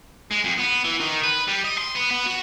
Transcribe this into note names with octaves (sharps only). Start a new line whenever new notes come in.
G#3
F2
B3
E3
D#3
B4
G3
D#5
C6
B3
B3
F#4